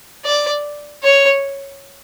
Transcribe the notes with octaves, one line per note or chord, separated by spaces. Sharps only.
D5
C#5